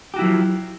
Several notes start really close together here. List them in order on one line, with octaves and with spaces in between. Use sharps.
G4 F#4 E4 F#3 F3